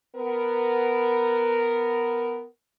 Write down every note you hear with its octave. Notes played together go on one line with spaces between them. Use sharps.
B3 A#4